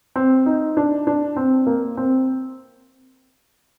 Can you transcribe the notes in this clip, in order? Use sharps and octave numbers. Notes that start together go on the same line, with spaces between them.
C4
D#4
D4
D4
C4
A#3
C4